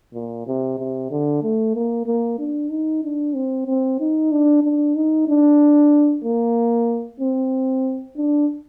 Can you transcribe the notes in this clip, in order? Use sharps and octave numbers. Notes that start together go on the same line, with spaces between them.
A#2
C3
C3
D3
A3
A#3
A#3
D4
D#4
D4
C4
C4
D#4
D4
D4
D#4
D4
A#3
C4
D4